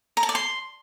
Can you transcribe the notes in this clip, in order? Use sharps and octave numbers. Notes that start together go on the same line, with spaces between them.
A#5
A5
D5
C6